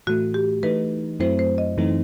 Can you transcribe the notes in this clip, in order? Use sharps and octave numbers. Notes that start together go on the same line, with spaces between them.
A2 E3 A3 F#4
G4
E3 A3 D#4 B4
F#2 F#3 A3 C4 E4 C5
C5
D#5
F#2 E3 A3 C4 D#4